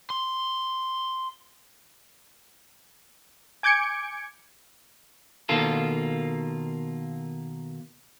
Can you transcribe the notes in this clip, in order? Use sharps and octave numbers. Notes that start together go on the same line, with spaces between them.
C6
G#5 D6 G6 G#6 C#7 D7
B2 D#3 A#3 F4 A4